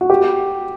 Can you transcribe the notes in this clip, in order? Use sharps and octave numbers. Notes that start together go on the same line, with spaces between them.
F#4
G4